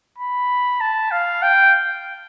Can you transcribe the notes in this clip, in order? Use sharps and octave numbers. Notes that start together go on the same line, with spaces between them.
B5
A5
F5
G5